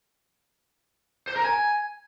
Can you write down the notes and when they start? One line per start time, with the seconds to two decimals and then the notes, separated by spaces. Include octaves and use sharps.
1.27 C5
1.36 A#4
1.44 G#5